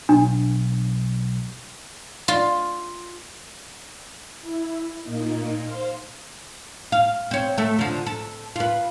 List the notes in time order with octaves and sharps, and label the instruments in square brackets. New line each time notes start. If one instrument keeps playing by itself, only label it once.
[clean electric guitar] B1 [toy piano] D4
[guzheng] F4
[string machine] E4
A#2 A#3 D#4
C5 F5
[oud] F5
C4 C#5
A3 A4
D3 F3
A4
F4 B4